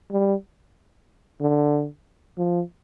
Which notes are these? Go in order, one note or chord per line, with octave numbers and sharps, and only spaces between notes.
G3
D3
F3